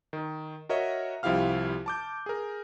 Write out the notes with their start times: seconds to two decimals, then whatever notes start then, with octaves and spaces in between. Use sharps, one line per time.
0.13 D#3
0.69 F#4 A#4 C#5 D#5 E5
1.23 C2 F3 E4 G4 F5 F6
1.86 A5 D6 G6
2.26 G#4 A#4